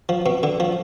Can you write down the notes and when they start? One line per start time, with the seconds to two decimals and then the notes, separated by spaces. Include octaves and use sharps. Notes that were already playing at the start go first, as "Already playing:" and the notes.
0.09 F3
0.26 B2
0.43 D3
0.60 F3